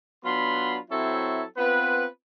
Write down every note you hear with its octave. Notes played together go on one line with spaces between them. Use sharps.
F#3 B3 D4 F4 B5 C6
F#3 C4 E4 A4 C#5 E5
B3 C4 F4 B4